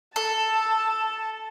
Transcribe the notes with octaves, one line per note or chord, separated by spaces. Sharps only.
A4 A5